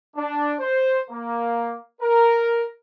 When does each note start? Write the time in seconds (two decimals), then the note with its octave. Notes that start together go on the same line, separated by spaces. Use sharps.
0.17 D4
0.59 C5
1.10 A#3
2.01 A#4